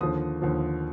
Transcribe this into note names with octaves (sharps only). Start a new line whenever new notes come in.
D#2 D3 F3 D#6
D#2 D3 F3